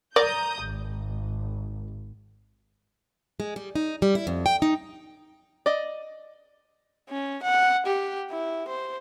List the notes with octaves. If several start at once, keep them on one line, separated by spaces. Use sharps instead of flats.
A#4 D5 A#5 D#6 G6
G#1
G#3
G3
D#4
G3
E4
F2
G5
D#4
D5 D#5
C#4
F#5
G4
E4
C5